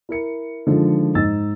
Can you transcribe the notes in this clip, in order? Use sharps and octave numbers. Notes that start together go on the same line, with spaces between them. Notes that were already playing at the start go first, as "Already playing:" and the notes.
E4 A#4 C#7
D3 D#3 F3 G#3
G#2 D#4 E6 A6